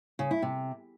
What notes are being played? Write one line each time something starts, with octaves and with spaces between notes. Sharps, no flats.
C#3
E4
C3